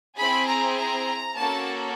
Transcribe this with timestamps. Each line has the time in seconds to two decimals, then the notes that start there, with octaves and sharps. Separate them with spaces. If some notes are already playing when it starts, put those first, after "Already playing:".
0.18 C4 E4 G#4 B5
0.48 A#5
0.77 A#5
1.36 A#3 C#4 F#4 A4 A5